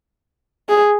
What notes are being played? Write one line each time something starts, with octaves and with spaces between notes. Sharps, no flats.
G#4